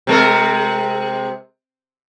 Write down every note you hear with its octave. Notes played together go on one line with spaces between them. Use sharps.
C3 G#3 A#4